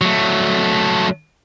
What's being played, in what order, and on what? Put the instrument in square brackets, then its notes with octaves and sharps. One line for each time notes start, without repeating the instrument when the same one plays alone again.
[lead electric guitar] F#3 A3